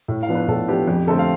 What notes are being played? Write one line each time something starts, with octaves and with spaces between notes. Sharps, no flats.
A2
F5
F3 B3 D4
B4
A2 A4
F3 B3 D4 G4
F2 G4
D3 A3 C4 A4
F5